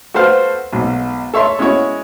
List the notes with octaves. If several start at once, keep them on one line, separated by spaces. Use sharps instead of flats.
F#4 A4 B4 C5 F5
B1 G#2
A4 C#5 E5 C6
G#3 C#4 E4 F#4 C#5